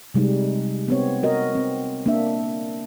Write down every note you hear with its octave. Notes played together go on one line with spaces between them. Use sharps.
C3 G3 G#3 D#4
B3 C4 C#5
F#4 A#4 D#5
C4
A#3 D4 E5